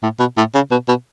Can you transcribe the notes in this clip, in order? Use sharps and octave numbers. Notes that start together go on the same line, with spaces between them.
A2
B2
A2
C#3
B2
B2